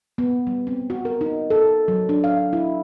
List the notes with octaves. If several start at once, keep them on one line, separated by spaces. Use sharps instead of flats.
B3
G3
C4
F#4
A#4
D#4
A4
F#3
D4
F5
E4